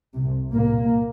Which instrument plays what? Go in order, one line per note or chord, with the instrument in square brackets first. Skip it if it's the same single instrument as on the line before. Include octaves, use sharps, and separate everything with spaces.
[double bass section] C2 C3
C2 A#2 A#3